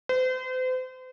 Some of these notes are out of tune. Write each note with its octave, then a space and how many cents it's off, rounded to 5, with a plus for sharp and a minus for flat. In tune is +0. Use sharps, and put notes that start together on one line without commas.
C5 -40